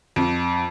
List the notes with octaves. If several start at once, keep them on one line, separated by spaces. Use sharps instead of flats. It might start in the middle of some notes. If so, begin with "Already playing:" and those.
F2